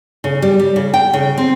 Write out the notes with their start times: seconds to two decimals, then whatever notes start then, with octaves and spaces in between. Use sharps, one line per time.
0.24 C#3
0.42 G3
0.60 G3
0.76 C#3
0.94 G5
1.13 C#3
1.38 C4